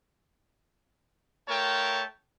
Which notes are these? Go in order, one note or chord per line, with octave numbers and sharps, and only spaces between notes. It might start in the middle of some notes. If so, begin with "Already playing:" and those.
A3 F4 A#4 C#5 G5 A5